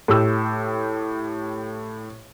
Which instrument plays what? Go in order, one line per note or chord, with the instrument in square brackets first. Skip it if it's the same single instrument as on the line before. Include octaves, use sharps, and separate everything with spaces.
[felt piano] A2 G4 E6